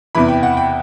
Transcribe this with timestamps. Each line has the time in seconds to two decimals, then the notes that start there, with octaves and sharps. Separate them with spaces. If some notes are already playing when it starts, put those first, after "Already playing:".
0.15 E2 C3 E3 B5
0.28 G5
0.43 F#5
0.57 G5